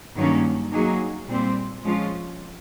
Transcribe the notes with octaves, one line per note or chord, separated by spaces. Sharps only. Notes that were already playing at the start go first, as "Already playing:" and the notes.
G2 D#3 F#3 A#3 C#4
F#3 A#3 D#4 G#4
A#2 G3 C4
F3 G#3 C#4 F4